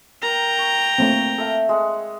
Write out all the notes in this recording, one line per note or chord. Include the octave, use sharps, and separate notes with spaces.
A#4 G5 A#5
C#6
A3 A#3 C4
A4 E5 F5
G#3 F#5